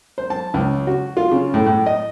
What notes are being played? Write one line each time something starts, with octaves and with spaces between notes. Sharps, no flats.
C5
A5
C#2
F#4
F4
C#3
A2
A2
D#5